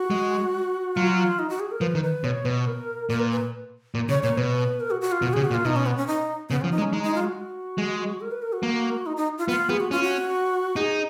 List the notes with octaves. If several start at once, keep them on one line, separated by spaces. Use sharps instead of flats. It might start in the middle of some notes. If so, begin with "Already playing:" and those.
Already playing: F#4
G#3
F#3 F4
D#4
F#4
G#4
A#4
F3 B4
D#3
B4
B2 C#5
B2 B4
A#4
A#2 A#4
B4
B4
A#2
C#3 C#5
A#2 C#5
B2 B4
A#4
F#4
F#4
F4
B2 F#4
C#3 G#4
F#4
A#2
F4
B2 D#4
C#4
B3
C#4
D#4
C#3 B3
F3 C#4
D#4
G#3
C#4
G#3 D#4
D#4
F4
F#4
G#3
A#4
B4
A#4
F#4
A#3
D#4
D#4
F4
B3 F4
B3 G#4
F#4
C#4 F4
F#4
D#4 G#4